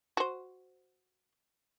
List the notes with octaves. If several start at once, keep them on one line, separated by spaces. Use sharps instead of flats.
F#4 C5